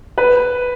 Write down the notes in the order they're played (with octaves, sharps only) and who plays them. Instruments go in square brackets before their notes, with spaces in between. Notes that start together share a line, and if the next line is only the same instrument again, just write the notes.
[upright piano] B4